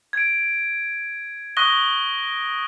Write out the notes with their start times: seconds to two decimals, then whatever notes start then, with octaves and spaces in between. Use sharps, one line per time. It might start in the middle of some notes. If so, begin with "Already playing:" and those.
0.13 G#6 D7
1.57 C#6 D#6 F#6 A#6 G7